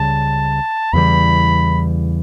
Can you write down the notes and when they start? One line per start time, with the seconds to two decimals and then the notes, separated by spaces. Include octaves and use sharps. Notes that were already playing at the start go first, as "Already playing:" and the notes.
Already playing: C#2 C#3 G3 A5
0.93 E2 C#3 E3 G3 B5